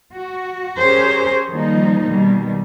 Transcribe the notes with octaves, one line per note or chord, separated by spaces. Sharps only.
F#4
C#4 G4 G#4 A#4 C5 C#5
D#3 F3 G3 A#3 D#4
B2 D#3 G3